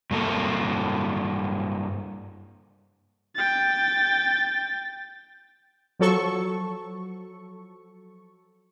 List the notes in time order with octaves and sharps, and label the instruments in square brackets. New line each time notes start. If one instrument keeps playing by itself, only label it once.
[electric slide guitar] G2 A#3 A4
[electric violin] G5 A6
[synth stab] F3 F#3 A4 C#6